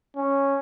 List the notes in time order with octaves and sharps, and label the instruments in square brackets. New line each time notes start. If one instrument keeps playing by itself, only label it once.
[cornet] C#4